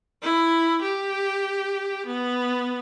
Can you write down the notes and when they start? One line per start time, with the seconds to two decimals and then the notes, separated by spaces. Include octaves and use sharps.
0.22 E4
0.82 G4
2.06 B3